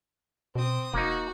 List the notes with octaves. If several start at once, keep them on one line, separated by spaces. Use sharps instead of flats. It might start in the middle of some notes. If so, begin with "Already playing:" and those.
B2 C4 D#6
E1 A#3 D#4 F#4